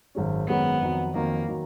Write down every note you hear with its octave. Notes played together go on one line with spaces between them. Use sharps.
G#1 F#2 D#3 G#3 C#4
G#1 F#2 D#3 G#3 B3 C#4
F2 D#3 F#3
F2 D#3 F#3 A#3
D#3 F#3